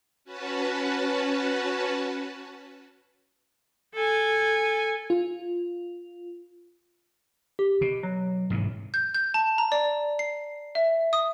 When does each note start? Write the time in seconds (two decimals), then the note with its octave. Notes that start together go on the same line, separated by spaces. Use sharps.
0.24 C#4 F#4 B4 A5
3.94 A4 G#5
5.10 F4
7.59 G4
7.81 B2
8.03 F#3
8.50 G#2 C3 E3
8.94 G6
9.15 G6
9.34 A5
9.58 A#5
9.72 D5
10.19 C7
10.75 E5
11.13 D#6